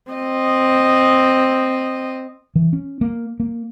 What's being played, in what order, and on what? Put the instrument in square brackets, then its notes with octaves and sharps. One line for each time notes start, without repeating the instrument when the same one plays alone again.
[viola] C4 D#5
[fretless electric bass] E3
C#4
A#3
A#3